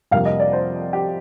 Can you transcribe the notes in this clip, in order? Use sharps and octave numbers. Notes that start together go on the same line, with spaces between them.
F2 C3 G3 A#3 F5
D#5
D5
C5
G4